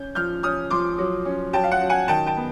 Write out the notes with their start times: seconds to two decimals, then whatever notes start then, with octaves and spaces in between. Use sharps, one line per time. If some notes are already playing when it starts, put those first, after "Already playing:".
Already playing: C#4 G6
0.15 F3 F6 G6
0.43 C#4 D#6 F6
0.70 F3 C6 D6
0.98 F#3
1.25 C#4
1.53 F#3 G5 A5
1.64 F5
1.72 F#5
1.81 F#3
1.90 F#5 G#5
2.08 D#3 G5 A5
2.26 G5 A5
2.37 B3